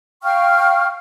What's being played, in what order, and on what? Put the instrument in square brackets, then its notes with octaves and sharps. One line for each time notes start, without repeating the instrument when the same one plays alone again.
[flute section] F5 G5 C#6 F6